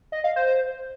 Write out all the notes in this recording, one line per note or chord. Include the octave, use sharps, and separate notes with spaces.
D#5
F5
C5